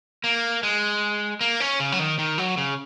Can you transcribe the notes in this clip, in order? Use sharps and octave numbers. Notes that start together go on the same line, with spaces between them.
A#3
G#3
A#3
C#4
C#3
F#3
D#3
D#3
F#3
C#3